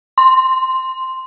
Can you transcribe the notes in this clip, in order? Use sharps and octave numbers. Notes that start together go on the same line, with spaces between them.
C6